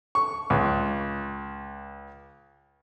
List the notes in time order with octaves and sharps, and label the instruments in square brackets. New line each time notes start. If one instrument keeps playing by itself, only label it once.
[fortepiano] C#6
C#2